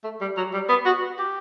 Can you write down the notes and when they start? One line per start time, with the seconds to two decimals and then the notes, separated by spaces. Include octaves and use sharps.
0.04 A3
0.21 G3
0.37 F#3
0.54 G3
0.69 B3
0.86 F#4
1.19 G4